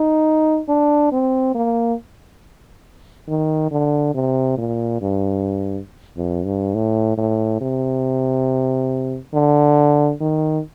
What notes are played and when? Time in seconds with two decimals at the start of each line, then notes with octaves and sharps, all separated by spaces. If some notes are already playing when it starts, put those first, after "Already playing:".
Already playing: D#4
0.68 D4
1.12 C4
1.55 A#3
3.28 D#3
3.71 D3
4.14 C3
4.58 A#2
5.01 G2
6.17 F2
6.45 G2
6.74 A2
7.18 A2
7.61 C3
9.34 D3
10.20 D#3